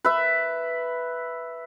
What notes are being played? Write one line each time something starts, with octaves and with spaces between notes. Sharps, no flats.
B4 E5